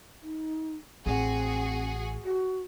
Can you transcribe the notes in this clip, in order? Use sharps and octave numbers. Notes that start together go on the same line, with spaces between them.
D#4
A1 C4 F#4 G#4
F#4